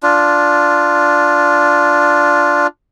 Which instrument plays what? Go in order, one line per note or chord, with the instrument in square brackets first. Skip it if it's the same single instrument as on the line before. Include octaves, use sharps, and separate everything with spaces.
[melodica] D4 F4